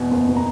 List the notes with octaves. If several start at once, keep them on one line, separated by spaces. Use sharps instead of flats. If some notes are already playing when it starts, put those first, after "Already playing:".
Already playing: E2 B2
F#1
B2
A#5